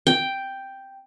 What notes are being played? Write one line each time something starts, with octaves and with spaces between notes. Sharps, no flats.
G5